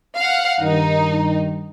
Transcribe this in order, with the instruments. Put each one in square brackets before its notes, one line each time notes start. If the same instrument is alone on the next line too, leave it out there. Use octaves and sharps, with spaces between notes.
[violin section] F5 F#5
[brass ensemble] G2 D#3 [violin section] D#4